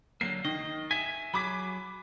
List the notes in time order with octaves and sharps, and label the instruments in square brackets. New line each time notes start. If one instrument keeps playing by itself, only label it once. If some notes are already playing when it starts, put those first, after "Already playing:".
[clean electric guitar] D3 F#3 A#3 [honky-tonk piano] C7
[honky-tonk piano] D#3 [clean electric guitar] D#5
[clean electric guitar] E5 G#5 [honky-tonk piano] B6
[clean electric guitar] F#3 F#4 G#4 [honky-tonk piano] B5 D6 B6